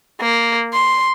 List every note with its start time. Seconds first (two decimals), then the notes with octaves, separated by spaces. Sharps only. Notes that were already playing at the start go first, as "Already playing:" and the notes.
0.21 A#3
0.73 C6